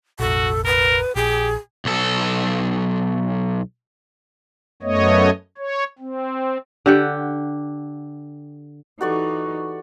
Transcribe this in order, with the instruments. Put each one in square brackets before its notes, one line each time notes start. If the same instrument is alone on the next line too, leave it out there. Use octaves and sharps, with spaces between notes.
[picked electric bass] F1 A#1 [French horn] F#4 [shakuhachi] A4
[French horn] A#4 [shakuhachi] B4
[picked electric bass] A#1 [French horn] G4 [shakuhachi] G#4
[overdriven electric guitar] B1 A4
[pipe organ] F#2 A3 B3 C#5 D#5
C#5
C4
[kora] D3 G4 F#5
[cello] E3 D#4 [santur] F#4 D5 C#6 [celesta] G4 A4